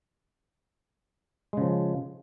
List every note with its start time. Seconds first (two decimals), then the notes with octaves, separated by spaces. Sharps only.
1.53 G#3
1.57 C#3
1.61 F3